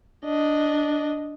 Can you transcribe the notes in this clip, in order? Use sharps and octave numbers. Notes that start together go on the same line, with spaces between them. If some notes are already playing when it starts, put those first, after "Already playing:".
D4 D#5